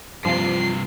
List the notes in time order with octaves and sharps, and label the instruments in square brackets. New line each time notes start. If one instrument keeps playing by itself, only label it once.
[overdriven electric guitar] G2 C3 [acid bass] F3 [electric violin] C7